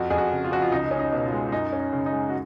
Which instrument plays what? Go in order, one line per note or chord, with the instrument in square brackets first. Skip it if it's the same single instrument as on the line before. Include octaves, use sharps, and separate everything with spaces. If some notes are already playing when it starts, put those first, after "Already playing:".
Already playing: [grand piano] F2 F#4
F2 G#4
F#4
C#3
F4
F3 F#4
F4
C#2 D#4
C#4
D#4
B2
F4
G#3
F#2 D#4
C#4
D#4
C#3
D#4
G#3
F#4